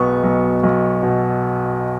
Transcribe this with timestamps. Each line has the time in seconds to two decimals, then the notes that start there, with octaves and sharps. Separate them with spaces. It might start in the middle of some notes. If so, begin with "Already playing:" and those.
Already playing: B1 B2 B3 C#6
0.24 B1
0.63 B1
1.03 B2